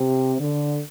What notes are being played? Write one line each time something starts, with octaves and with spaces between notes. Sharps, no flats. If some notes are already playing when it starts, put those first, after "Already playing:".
Already playing: C3
D3